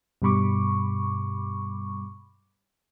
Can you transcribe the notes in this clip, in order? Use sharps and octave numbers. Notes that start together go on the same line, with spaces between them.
G2 B2 G3 B5 C#6 D6